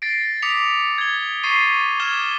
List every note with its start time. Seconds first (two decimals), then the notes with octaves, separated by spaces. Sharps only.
0.02 A6 A#6 C7 D7
0.42 D6 D#6 A#6 B6 C#7 F7
0.98 G#6 G7
1.43 C#6 A6 B6 C7 D#7 G7
2.00 D6 F6 G#6 E7 G7